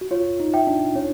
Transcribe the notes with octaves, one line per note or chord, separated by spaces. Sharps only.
F#4
F4 C#5
D#4
E5 G5
D4
C#4 C#5